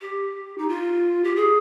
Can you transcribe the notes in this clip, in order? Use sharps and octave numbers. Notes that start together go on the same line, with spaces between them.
G4
D#4
F4
G4
G#4